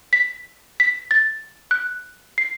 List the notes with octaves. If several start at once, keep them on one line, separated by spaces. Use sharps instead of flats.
B6
B6
A6
F#6
C7